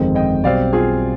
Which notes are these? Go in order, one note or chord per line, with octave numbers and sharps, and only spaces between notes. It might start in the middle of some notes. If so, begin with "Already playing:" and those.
Already playing: G1 F2 D#3 G#3 C4
D#5 G5
B1 B2 G3 C4 D5 F5
F4 G#4